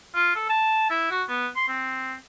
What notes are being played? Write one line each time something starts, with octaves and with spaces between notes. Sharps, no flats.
F4
A4
A5
E4
F#4
B3
C6
C4